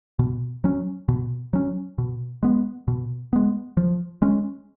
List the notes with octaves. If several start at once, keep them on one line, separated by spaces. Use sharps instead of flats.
B2
F#3 C#4
B2
F#3 C#4
B2
G#3 B3
B2
G#3 B3
F3
G#3 C#4